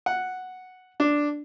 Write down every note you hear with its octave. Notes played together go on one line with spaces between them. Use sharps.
F#5
D4